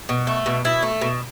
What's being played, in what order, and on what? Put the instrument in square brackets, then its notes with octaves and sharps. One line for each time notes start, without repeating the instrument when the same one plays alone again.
[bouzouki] B2
A3
B2
B2 E4
A3
B2